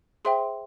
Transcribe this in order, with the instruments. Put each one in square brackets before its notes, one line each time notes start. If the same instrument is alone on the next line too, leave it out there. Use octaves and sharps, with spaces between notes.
[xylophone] G#4 C5 E5 G5 C6